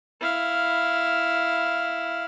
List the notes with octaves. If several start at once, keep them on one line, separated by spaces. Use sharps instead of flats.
E4 F5